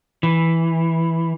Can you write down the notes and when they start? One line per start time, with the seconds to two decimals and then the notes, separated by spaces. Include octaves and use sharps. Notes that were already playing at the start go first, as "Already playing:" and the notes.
0.23 E3